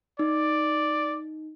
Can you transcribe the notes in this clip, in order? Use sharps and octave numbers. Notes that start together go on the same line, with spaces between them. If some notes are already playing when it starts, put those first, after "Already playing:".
D#4 D5